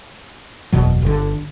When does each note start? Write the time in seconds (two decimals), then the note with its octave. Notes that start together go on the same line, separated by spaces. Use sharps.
0.72 F#1 E2 B2 F#3
1.02 G1 D3